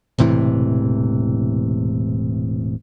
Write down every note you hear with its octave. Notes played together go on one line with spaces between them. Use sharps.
E1 A2 C3 E3